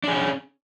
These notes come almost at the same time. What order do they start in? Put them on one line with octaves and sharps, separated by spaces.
D4 G#4 C#4